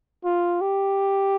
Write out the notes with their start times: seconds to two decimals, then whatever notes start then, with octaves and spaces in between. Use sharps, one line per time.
0.25 F4
0.61 G4